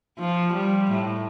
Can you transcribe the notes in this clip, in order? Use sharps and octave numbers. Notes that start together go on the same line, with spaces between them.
F3
G3
A2